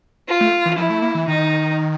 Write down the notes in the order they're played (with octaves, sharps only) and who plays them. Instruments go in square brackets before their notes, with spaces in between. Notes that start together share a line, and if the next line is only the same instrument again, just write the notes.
[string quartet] F4
[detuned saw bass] A3
E3
[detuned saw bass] F3 [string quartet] E4
[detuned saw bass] A3
A#3
E3
[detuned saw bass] D#3 [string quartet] D#4